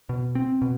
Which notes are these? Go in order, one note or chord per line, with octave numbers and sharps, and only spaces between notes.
B2
C4
B2